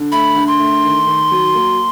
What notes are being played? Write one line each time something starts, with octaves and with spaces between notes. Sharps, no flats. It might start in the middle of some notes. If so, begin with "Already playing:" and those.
Already playing: D3
A3 B5
D3
C6
A3
D#3
D#3
F#3
A#3